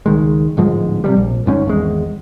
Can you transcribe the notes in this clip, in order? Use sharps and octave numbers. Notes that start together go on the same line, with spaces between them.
C#2 D#3 G#3
D1 G#2 F3 G#3
C3 F3 G3
A#1
G1 G#2 C4 C#4
G#1 E2 G#3